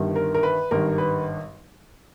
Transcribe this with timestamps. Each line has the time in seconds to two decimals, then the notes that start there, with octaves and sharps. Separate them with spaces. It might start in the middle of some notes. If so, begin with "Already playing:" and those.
Already playing: G1 G2 D#3
0.16 A#4
0.34 A#4
0.43 B4
0.71 G#1 G2 D#3 A#4
0.98 B4